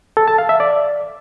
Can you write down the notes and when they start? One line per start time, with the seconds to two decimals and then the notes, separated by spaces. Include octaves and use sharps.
0.17 A4
0.28 A5
0.38 F5
0.49 E5
0.60 D5